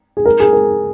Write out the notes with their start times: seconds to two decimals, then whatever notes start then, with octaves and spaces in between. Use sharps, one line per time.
0.17 G#4
0.25 A#4
0.40 G#4
0.53 A#4